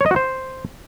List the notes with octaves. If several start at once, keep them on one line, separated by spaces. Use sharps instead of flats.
C#5
D#5
F#4
C5